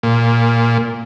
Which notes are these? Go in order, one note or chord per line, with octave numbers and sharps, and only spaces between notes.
A#2